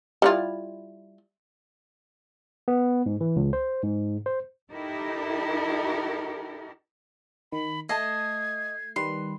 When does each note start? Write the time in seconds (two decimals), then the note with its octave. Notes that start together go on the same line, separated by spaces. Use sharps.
0.22 G3 E4 F4
2.68 B3
3.06 G#2
3.21 E3
3.36 C#2
3.53 C5
3.83 G#2
4.26 C5
4.72 D#4 E4 G4 A4 A#4
7.52 D#3 B5
7.89 A3 D#5 A5 G#6 C7
8.96 D#3 G3 B4 C6